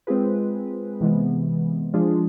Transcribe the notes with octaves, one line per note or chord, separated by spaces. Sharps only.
G#3 C4 F4 G#4 B4
C3 E3 G#3 B3
F3 G#3 D4 F4 G#4